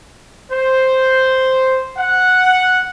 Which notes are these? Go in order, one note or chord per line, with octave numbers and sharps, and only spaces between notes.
C5
F#5